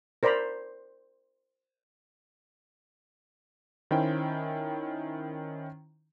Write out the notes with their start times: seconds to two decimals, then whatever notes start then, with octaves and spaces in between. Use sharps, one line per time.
0.23 A#4 C5 D5 A#5 B5
3.91 D#3 C#4 E4 C5 G5